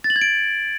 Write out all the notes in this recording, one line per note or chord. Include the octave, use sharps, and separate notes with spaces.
A6
F#7
G#6
D7